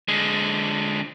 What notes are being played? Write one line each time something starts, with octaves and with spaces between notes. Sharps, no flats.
D3 G#3